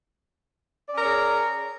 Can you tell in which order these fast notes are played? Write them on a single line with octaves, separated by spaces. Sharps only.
D5 C#4 A#4 C#5 G#4